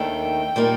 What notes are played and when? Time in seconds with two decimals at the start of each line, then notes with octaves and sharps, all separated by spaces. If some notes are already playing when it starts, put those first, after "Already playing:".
Already playing: D#2 D#3 A3 D4 G5
0.56 A#2 G3 A#3 D#4